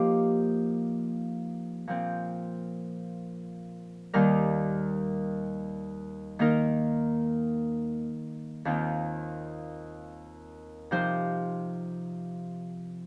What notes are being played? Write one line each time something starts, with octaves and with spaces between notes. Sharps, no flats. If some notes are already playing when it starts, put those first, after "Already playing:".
Already playing: F3 A#3 D#4 G4 C5
A#2 F3 C4
D#2 D#3 G3 D#4 A#4
D#3 A#3 D#4 A#4
D#2 D#3 C4 F4
C3 F3 D#4 C5